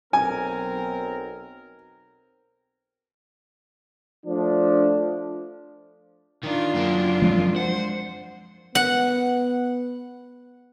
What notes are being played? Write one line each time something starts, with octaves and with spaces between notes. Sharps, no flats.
B1 C4 A#4 G#5
F3 A3 D4
D#3 D4 F4
F#2 A#3
F3 G#3 C4
C5 F#5
B3 F#5